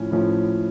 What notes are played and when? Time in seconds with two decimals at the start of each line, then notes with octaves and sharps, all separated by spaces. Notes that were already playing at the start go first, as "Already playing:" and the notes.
Already playing: A2 F3 C#4 E4
0.11 A2 F3 C#4 E4